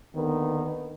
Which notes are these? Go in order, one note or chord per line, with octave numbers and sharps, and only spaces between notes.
D#2 D3 D#3 B3